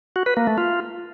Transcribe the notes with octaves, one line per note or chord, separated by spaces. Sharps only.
F#4
B4
A#3
A3
F4